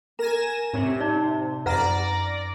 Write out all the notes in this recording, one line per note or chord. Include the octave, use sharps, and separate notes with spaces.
A#4 G#5 A#6 E7
A2 C3 C#5
D#4 D5
F#2 B4 D5 F#5 A#5 A#6